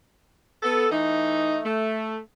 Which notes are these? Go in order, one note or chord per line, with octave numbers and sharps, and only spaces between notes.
B3 A4
E3 A3 D#4
A3